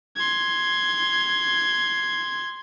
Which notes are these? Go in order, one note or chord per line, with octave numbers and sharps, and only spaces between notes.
C6 G#6